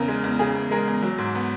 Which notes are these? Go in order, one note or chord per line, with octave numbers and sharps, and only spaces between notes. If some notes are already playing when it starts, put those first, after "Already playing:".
Already playing: E2 C#3 A#4
G#3
E2
C#3 G#4
E2
G#3 A#4
E2
F#3
G#2
B3